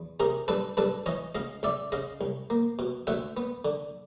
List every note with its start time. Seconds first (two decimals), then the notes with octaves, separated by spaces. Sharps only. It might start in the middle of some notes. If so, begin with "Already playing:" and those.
Already playing: E2
0.20 C3 G#4 A#4
0.48 G2 A4 B4
0.77 G2 A4 B4
1.06 E3 C#5 D#5
1.35 C#2 D#5 F5
1.63 C#2 D5 E5
1.92 C#3 D#5 F5
2.21 C2
2.50 A#3
2.79 B2
3.07 D2 E5 F#5
3.37 B3
3.65 D3